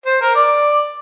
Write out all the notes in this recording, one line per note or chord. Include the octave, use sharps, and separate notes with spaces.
C5
A#4
D5